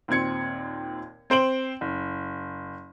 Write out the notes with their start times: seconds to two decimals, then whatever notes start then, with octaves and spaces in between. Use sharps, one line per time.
0.08 D#2 A#2 C4 G#6 C#7
1.30 C4 C5 D7 F#7
1.81 F#1